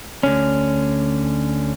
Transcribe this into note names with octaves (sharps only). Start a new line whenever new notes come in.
D2 D3 C#4